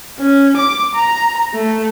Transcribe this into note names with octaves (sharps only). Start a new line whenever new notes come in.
C#4
D6
A#5
A3